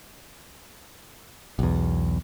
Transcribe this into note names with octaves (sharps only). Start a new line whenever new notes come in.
B1 E2